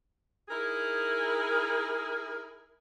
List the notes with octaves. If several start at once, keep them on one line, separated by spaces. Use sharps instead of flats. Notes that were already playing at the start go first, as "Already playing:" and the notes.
D#4 E4 G#4 A#4